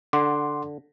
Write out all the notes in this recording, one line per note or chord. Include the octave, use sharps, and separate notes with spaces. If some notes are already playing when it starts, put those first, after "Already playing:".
D3 F#5 C6 D6